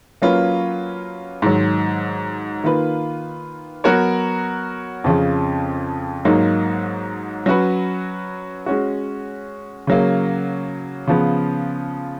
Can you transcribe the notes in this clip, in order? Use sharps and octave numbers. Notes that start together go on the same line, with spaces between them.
F#3 A#3 C#4 F4 B4
G#2 D#3 F#3
D#3 A#3 F4 B4
F#3 B3 F#4 A#4 C#5
F2 C#3 F3
G#2 F#3 A#3 D#4
F#3 C#4 F#4 B4
G#3 C#4 F#4
C#3 F#3 A#3
C#3 F3 B3